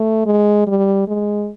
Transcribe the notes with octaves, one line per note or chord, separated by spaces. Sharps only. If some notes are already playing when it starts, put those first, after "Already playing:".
Already playing: A3
G#3
G3
G#3